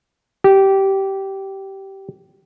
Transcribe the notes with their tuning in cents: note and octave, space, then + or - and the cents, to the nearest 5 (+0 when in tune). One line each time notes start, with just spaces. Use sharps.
G4 -15